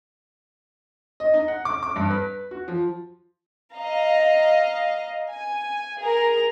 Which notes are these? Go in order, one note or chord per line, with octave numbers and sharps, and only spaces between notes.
D#5
D#4
F#5
D6
D6
G2
B4
F#4
F3
D#5 F5 A#5
G#5
G#4 A#4 A#5